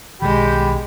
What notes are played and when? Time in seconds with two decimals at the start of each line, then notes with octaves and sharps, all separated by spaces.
0.22 B1 B2 D#3 G#3 G4 G5 B5